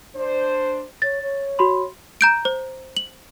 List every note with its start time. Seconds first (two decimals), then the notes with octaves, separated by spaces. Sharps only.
0.16 D4 C5
1.02 C#5 A6
1.21 C#5
1.59 F#4 B5 C6
2.21 A#5 G6 D7
2.45 C5
2.97 F#7